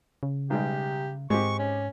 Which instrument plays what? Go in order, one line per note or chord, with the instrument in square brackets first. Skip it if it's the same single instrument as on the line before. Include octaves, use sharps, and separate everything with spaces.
[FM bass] C#3
[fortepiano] B1 G3 G#3 [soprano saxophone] G4
[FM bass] G#2 [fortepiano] G#3 C4 G4 [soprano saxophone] C#6
[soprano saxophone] C#4